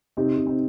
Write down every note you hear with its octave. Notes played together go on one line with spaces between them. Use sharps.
C3 C4 D#4
C3
C4 D#4